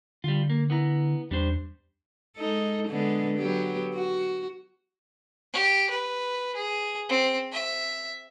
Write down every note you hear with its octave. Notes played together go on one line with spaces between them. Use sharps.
D3 G3 F4
A#3
B3 E4 A#5
E2 G3 D4 C5
G#3 D#4 A4
D3 G#3 B3
F#3 B3 G4
F#4
G4
B4
G#4
C4
E5